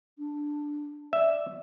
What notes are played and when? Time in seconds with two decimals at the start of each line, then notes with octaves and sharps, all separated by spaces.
0.19 D4
1.13 D5 E5